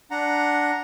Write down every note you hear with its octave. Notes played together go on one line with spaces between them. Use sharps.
D4 F#5 A#5